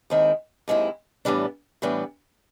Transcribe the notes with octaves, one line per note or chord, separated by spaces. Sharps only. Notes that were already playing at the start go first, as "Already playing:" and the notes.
D#2 D#3 G#3 C4 E4
D#2 D#3 G#3 C4 E4
A2 E3 G3 B3 D4
A2 E3 G3 B3 D4